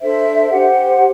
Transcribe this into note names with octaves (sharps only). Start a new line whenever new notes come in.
D4 A4 C5 E5
G4 C5 F#5